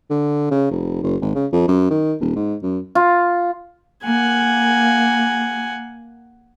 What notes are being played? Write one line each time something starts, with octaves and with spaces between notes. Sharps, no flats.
D3
C#3
F1
F#1
G#1
C#3
F2
F#2
D#3
D#1
G#2
F#2
F4
A#3 F#5 G#5